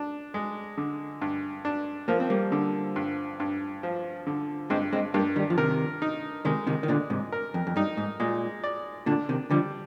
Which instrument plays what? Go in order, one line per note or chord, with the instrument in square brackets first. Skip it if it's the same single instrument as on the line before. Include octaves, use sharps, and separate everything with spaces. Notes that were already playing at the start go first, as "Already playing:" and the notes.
Already playing: [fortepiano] D4
G#3
D3
G2
D4
[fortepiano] F3 [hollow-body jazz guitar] A#3
[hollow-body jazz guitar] C4
G3 A#3
[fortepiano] D3
G2
G2
F3
D3
[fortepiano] G2 [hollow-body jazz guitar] G#3 C4
[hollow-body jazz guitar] G#3 C4
[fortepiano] G2 [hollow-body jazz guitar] G3 A#3
[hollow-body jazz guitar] D#3 G3
F3
[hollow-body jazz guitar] C3 D#3 [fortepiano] A#4
[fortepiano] D#4
[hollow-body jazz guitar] C3 D#3 [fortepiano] G#3
[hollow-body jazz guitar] C3 D#3
D#3
[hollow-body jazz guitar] A#2 D3 [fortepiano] D5
[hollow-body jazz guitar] G#2 C3
[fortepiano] A#4
[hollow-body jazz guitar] F2
F2
[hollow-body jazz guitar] G2 [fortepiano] D#4
[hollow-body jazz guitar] G#2
[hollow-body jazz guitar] A#2 [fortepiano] G#3
[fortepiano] D5
[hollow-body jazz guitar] A#2 D3 [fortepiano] D4
[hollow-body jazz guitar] C3 D#3
[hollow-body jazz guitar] D3 F3 [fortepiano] G3